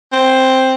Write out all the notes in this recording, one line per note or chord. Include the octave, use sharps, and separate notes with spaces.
C4